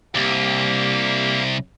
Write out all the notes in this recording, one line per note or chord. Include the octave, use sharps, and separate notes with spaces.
C2 A#3 G4